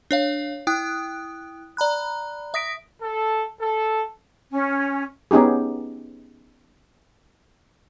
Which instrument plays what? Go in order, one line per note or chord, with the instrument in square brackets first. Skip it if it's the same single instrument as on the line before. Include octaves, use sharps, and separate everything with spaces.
[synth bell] D4 C#5 F5
E4 G5 D#6 F#6
D5 A#5 B5 F#6
E5 D#6 A#6 B6 D7
[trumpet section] A4
A4
[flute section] C#4
[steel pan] B3 C#4 D#4 G4 G#4